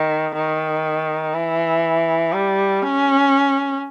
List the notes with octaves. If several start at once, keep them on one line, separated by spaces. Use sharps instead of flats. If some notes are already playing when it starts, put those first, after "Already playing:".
Already playing: D#3
D#3
E3
G3
C#4